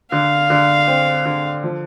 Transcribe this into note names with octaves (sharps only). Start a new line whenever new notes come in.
D3 F5
D3
C4
D3
F3